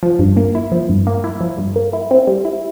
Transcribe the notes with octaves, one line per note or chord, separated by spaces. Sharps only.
F3
G2
A#3
E4
F3
G2
A#3
E4
F3
G2
A#3
E4
C4
G3
E4